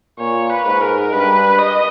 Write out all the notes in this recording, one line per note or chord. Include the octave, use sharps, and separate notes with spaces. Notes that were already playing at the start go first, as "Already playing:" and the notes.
A#2 C#5
B4
G#2
A#4
G2 B4
D#5